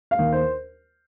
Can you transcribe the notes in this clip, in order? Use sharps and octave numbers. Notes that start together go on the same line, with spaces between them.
F5
D#2
C5